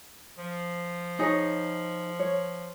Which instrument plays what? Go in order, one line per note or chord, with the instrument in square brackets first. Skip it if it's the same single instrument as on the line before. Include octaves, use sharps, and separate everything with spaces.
[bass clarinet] F3
[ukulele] D#4 G#4 C#5
C#5